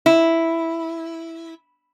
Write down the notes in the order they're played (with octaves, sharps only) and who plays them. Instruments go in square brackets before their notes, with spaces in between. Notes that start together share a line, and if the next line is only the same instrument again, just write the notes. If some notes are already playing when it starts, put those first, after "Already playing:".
[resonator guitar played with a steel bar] E4